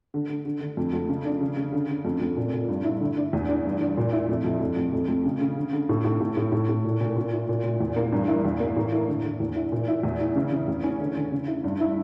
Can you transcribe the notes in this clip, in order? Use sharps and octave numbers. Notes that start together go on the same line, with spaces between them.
D3
D3
D3
D3
F2
F2
C#3
D4
C#3
C#3
D3
D3
F2
F2
A#2
A#2
G2
E4
D3
D4
E2
D4
G2
D4
A#2
E4
F2
F2
F2
F2
F2
F2
C#3
C#3
D3
D3
A2
A2
A2
A2
A2
A2
A#2
A#2
A#2
E4
A#2
A#2
E2
A#3
G2
E4
E2
A#3
A2
E4
D3
D3
E2
E4
A#2
E4
E2
E4
C#3
C#3
E2
C#4
D3
D3
C#3
E4
G2
E4